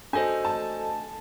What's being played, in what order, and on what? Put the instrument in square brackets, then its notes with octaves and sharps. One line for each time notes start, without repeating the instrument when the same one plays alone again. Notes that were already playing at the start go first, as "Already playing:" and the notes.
[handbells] D4 F#4 A4 C5 D#5 [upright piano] G#5
[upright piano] A5